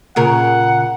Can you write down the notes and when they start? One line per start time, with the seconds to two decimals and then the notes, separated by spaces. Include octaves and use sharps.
0.16 A#2 C#3 A#4 F#5